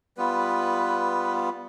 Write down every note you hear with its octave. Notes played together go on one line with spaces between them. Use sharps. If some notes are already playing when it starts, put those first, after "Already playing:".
G3 B3 F4 B4